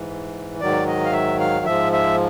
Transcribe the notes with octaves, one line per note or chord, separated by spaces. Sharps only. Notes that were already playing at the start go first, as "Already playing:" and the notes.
Already playing: G#2 E3
G#2 D#3 F#3 D5
D#5
F5
E5
F5
G#2 F3 E5
E5